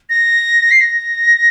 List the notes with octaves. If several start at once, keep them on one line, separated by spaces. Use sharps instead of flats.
A#6
C7
A#6